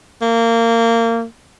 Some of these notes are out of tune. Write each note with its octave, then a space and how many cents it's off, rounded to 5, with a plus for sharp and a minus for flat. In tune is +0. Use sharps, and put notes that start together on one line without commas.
A#3 -25